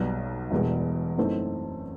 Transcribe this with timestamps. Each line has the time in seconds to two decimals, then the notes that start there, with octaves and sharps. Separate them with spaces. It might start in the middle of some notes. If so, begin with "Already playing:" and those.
Already playing: B1 B2 G3
0.51 E1 E2 B2 G3
1.17 F#2 E3 A3 C4 D#4